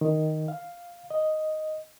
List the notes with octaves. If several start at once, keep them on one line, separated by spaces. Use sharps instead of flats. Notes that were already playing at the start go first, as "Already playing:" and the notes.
D#3
F5
D#5